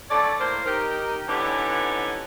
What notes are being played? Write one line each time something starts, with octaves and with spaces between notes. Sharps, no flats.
D3 A3 C#5 D5
A2 A#3 A#4 C5
D#4 G4 A#4
D3 E3 B3 C#4 D#4 G4